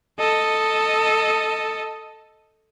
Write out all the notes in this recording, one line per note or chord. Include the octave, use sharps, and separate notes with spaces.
A4 D#5